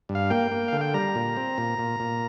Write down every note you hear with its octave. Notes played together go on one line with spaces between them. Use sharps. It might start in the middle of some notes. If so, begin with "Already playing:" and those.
G2
F5
A#3 G5
A#3
D3 F5
G5
G3 A#5
A#2
C4
A#2
A#2
A#2